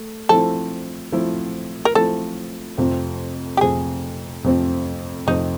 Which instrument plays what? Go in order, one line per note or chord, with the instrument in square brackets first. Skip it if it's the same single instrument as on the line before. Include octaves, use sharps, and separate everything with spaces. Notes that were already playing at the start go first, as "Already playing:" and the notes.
Already playing: [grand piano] A3
[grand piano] F3 A3 C4 E4 [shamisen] A4
[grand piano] F3 A3 C4 E4
[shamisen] A#4
[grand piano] F3 A3 C4 E4 [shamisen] A4
[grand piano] F2 C3 F3 A3 C4
[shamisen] G4
[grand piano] F2 C3 F3 A3 C4 [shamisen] G#4
[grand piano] F2 C3 F3 A3 C4
[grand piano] F2 C3 F3 A3 C4 [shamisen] D#4